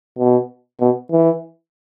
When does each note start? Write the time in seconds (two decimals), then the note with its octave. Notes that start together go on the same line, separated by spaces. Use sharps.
0.19 B2
0.81 B2
1.12 E3